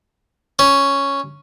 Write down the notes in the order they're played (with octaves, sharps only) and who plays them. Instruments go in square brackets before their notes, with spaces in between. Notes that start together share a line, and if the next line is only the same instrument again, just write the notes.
[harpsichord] C#4